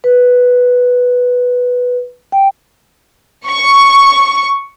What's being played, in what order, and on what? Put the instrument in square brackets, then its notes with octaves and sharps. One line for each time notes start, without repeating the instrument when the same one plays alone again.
[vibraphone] B4
G5
[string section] C#6